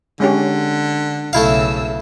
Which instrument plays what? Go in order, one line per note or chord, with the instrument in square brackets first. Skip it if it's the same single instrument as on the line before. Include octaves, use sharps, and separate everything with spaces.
[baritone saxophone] D3 [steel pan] G#3 C#4 G4
[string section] B1 C#3 E6 [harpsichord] A3 E4 F5